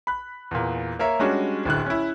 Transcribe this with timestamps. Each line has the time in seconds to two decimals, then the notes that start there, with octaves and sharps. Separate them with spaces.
0.07 B5 F#6
0.51 E2 A#2
0.99 A#3 A#4 C#5 E5
1.20 G3 G#3 C#4 D4 F#4
1.65 D1 A2 D3 F#6
1.86 C#4 E4